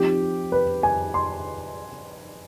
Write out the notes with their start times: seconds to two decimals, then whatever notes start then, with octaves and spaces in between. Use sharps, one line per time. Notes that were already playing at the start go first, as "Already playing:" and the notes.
Already playing: F3 C4 D#4 G4
0.52 B4
0.83 G#5
1.14 C6